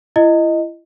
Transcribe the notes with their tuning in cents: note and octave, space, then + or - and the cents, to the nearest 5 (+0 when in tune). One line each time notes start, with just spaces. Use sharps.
E4 +35 D#5 +0